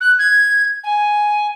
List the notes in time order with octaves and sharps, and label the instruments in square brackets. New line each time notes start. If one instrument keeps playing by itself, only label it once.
[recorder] F#6
G#6
G#5